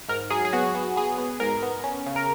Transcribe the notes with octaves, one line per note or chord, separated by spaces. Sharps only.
G#2 A#4
F#3 G#4
G#4
B3 F#4
B3
B3 G#4
B3
G#2 A#4
B3
C#4
C#3
A#4